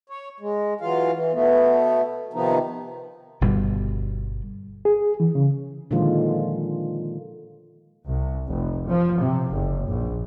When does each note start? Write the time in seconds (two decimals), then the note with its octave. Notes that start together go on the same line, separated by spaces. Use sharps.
0.10 C#5
0.40 G#3
0.81 E3 F#3 F4 F5
1.13 E3
1.33 B2 A3 B3
2.33 C3 D#3 F3 B3 D#4
3.41 G1 B2 G3
4.85 G#4
5.20 E3
5.35 C#3
5.91 A#2 D3 D#3 F3 G#3 F4
8.07 C2
8.48 F1
8.86 F3
9.19 C3
9.50 F#1
9.87 A#1